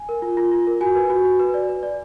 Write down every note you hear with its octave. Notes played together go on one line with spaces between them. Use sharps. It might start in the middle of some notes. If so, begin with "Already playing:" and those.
Already playing: G#5
A#4
F4
F4
F4
A#4
F#4 G#5
B4
F#4
F#4
B4
D5
B4
D5